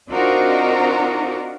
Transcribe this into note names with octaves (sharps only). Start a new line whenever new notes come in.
C4 D4 D#4 F4 F#4 A#4